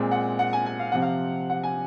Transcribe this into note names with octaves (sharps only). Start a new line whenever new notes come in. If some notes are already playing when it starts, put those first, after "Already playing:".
Already playing: A#2 G#3 C4
F#5
F#5
G#5
G#5
F5
C3 F3 C4 F#5
F5
F#5
G#5